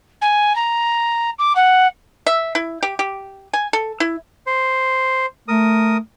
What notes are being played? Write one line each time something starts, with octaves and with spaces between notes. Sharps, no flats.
G#5
A#5
D6
F#5
E5
E4
G4
G4
G#5
A4
E4
C5
A3 A#4 D#6